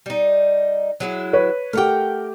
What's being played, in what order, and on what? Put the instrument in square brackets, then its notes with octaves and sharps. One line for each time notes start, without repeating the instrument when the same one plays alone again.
[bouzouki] G3 D#4
F#3 G#3 E4
[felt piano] B4 C#5
[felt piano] A3 G4 [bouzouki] A#4 F#5 G5